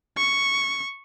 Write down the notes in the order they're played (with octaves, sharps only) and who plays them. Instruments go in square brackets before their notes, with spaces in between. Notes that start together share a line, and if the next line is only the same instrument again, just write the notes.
[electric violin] C#6